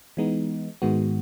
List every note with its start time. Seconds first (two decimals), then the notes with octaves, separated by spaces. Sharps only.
0.17 E3 G#3 B3 D#4
0.82 G#2 D#3 G#3 B3 F#4